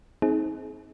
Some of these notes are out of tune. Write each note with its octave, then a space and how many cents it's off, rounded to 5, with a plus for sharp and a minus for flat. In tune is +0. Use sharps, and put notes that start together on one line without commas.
C4 +0 D#4 +30 G#4 +25